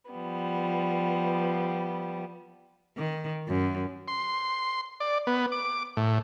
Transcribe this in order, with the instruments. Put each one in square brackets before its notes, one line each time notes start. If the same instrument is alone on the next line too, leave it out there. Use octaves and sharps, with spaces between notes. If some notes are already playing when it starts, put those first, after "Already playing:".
[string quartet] F3 G3 B3
[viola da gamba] D#3
F#2
[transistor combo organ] C6
D5
B3
D6
A2